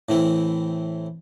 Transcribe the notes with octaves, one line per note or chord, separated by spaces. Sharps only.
A2 E3 C4